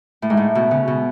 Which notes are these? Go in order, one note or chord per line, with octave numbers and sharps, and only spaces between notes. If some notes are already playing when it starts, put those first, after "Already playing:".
A2
G#2
A2
B2
C#3
B2